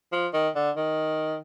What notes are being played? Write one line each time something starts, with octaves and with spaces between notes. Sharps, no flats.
F3
D#3
D3
D#3